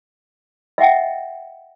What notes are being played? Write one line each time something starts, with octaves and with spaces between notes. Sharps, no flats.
D#5 E5 F#5 G5